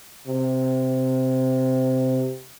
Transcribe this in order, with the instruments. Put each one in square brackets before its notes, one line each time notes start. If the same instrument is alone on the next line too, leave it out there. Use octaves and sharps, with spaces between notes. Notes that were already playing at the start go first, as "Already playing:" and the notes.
[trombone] C3